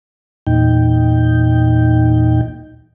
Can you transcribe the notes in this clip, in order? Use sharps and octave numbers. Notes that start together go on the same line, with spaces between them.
E2 A#2 D#4 G5